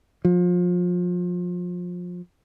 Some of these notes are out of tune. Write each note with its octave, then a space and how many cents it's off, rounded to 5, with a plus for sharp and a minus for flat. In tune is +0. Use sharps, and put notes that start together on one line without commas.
F3 +30